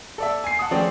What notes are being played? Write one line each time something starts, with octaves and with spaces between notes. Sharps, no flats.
A4 D5 E5
G#5 C7
F#5 A5 D#6
F3 A3 C4 C#4 G#4 D5